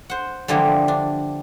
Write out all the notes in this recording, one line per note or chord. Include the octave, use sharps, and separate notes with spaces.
C5 F#5
D3 E3 F3 G3 G#3 A#3
D4